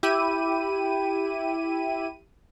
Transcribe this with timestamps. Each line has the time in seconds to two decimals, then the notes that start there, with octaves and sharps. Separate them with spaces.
0.03 E4 G4 D#7